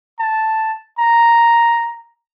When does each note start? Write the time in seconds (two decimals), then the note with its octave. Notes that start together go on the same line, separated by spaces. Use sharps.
0.20 A5
0.99 A#5